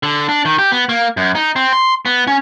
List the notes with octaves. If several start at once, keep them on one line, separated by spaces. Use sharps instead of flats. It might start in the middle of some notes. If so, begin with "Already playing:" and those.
D3
D4
D#3
G4
B3
A#3
F#2
D#4
C4
C6
B3
C#4